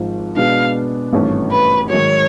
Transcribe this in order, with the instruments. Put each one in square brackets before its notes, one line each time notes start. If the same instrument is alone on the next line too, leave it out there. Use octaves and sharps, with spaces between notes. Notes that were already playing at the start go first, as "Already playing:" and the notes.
Already playing: [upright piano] G#1 G#2 F3
[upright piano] B2 G#3 B3 D4 [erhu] F5
[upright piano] G#1 G2 E3 A3 C#4
[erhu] B4
[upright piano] G#2 D#3 F#3 [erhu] C#5